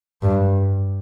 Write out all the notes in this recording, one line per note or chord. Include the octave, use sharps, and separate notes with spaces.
G2